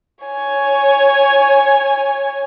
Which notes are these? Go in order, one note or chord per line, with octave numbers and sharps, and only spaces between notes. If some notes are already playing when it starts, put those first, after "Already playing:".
C#5 G#5